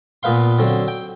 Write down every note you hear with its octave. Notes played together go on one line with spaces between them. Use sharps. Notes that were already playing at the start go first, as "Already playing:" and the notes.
A#2 B3 B4 F5 C6
D3 F#3 C4
G5